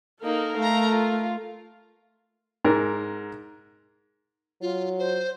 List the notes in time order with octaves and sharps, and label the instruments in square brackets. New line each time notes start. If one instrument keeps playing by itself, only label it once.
[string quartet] A#3 [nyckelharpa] D#4 [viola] A4 A#4
[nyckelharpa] A3 [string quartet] F5 A#5
[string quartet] F4
[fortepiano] G#2 A#4
[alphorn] F#3 [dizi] F4
[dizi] C5